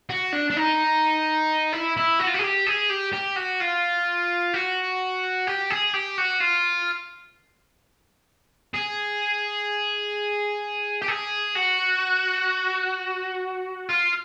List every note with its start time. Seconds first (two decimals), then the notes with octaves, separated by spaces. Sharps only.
0.09 F#4
0.32 D4
0.50 D4
0.57 D#4
1.73 E4
1.97 E4
2.20 F#4
2.27 F4
2.34 F#4
2.39 G#4
2.44 G4
2.67 G#4
2.90 G4
3.13 G4
3.37 F#4
3.60 F4
4.54 F#4
5.47 G4
5.70 G#4
5.93 G4
6.18 F#4
6.40 F4
8.74 G#4
11.02 G4
11.08 G#4
11.55 F#4
13.90 F4